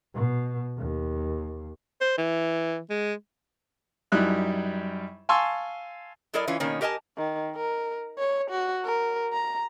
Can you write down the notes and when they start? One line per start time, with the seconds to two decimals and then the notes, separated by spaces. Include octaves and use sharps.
0.15 B2
0.78 D#2
2.01 C5
2.18 E3
2.90 G#3
4.12 F#2 G3 D#4 E4 F#6
5.29 F5 G#5 A5 C6 C#6 E6
6.33 F#3 E4 A4 A#4 D5 D#5
6.48 E3 C#4 F4
6.60 B2 D#3 A#3 C#4
6.81 G4 A#4 D#5 G#5 A5
7.18 D#3
7.56 A#4
8.18 C#5
8.51 F#4
8.85 A#4
9.33 A#5